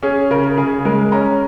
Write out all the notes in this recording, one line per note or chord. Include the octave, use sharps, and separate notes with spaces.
C#4 G#4
C#3 A#4
C#3 G#4
G#3 A#4
C#4 A#5